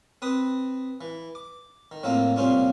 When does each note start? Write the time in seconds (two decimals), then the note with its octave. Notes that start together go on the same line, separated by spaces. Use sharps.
0.22 C4 B4 D#6
1.01 E3
1.35 D6
1.92 D#3
2.03 A2 F3 A#3 C4 F4
2.36 C2 A#2 C4 C#4 F4 C5